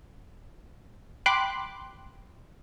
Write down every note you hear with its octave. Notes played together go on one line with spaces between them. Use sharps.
G5 B5 C6 D6 F#6